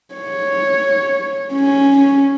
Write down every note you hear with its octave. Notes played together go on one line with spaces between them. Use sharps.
C#5
C#4